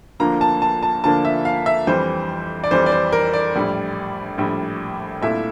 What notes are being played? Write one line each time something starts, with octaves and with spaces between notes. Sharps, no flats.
D2 D3 F3 A#3 D4 A#5
A5
A5
A5
D2 D3 F3 A#3 D4 A5
E5
F5
E5
F2 E3 G3 C5
D5
F2 E3 G3 C5
D5
C5
A#4
D5
A#1 A2 G3
A#1 A2 G3
C2 A#2 A3 E4 E5